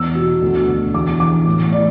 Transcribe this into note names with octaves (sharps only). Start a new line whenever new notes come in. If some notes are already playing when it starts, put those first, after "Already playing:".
Already playing: E2 E6
B2
D2
D3
E2 D6
E3 D6
A2
E3 D5